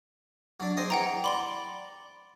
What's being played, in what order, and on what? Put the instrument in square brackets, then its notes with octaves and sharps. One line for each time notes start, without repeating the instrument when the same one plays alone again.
[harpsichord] F#3 D4
C4 G#4 D#5
[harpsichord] E3 [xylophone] F#5 G5 A#5
[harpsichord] D5 [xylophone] B5 C6 G7